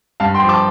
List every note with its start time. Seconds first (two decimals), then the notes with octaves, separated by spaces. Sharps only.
0.20 G2 F5 A5
0.34 G5 C6
0.42 F3
0.49 A5 D6